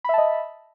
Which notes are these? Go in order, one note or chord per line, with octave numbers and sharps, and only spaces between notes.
D#5 E5 A5 B5